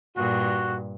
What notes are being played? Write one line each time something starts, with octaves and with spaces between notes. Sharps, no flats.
G2 A#2 F#4